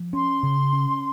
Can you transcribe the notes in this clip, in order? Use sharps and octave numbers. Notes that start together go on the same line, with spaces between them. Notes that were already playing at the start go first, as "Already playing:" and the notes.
Already playing: F3
C#4 C6
C#3
C#4